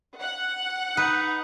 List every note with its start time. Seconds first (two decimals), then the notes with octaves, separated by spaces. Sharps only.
0.21 F#5
0.97 D#4 B4